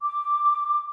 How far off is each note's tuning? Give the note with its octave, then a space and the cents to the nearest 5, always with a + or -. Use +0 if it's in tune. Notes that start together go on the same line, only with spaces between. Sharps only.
D6 +0